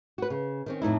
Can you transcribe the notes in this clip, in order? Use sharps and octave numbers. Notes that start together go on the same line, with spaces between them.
F#4 B4
C#3
D#3 C4 C#4
F2 A2 D#4 E4